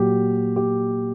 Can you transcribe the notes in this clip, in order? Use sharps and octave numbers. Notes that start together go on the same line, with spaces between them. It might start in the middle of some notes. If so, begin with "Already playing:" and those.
Already playing: A#2 F#3 G4
G4